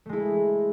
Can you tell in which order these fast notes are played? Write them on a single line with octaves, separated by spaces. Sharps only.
A3 G#3 E4